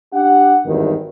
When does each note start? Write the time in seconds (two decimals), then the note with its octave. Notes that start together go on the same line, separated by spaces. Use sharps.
0.14 D4 G4 F#5
0.66 G#1 E2 G2 D#3